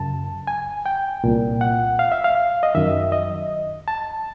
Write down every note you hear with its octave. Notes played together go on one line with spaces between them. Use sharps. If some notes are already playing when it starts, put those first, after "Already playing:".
Already playing: F#2 C#3 A5
G#5
G5
C2 A#2
F#5
F5
E5
F5
D#5
F#2 D#3 E5
D#5
A5